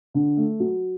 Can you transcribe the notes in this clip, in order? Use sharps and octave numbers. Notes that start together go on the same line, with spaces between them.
D3
A3
F#3